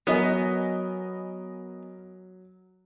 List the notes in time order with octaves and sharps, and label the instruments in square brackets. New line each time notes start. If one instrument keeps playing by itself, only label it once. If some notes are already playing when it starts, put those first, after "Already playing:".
[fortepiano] F#3 [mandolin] B3 [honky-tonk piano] A#4 D#5 G#5